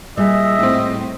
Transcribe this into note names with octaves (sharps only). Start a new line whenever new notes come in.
A#2 G3 G#4 D#5 E5 E6
A2 C4